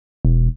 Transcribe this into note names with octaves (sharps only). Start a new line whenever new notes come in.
E1